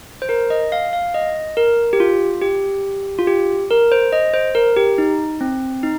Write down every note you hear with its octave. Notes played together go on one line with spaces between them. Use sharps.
C5
A#4
D#5
F5
F5
D#5
A#4
G4
F4
G4
F4
G4
A#4
C5
D#5
C5
A#4
G4
D#4
C4
D#4